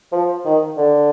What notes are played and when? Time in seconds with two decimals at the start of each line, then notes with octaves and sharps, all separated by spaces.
0.12 F3
0.45 D#3
0.77 D3